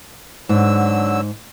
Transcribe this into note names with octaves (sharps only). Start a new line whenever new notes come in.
G#2 D3 F#3 E6